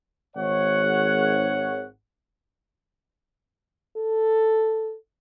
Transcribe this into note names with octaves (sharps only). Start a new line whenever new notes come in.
G#1 C#5 F#5
A4